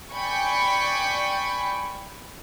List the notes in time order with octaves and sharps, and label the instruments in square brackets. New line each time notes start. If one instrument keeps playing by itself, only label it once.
[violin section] D5 G5 G#5 B5 C#6